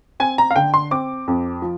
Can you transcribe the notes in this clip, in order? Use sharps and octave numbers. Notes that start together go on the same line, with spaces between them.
C4 G#5
A#5
F5
D3 G5
C6
C4 D6
F2
F3